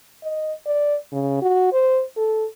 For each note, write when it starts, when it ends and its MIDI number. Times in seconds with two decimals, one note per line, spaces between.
0.23 0.53 75
0.66 0.96 74
1.12 1.40 49
1.42 1.72 66
1.72 2.03 72
2.16 2.46 69